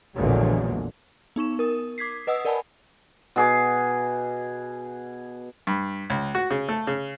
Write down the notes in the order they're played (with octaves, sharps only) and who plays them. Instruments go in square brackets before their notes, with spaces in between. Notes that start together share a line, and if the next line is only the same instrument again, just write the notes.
[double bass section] A#1 E2 A#2 D3 F#3 G#3
[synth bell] B3 D#4 C#6 E7
A#4 D#6
D6 G#6 B6 C7
B4 D#5 F#5 D#6 E6
A#4 D5 F#5 G#5 A5 B5
[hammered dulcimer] B2 G#4 D6
[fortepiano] G2
C#2
F#4
C#3
A3
C#3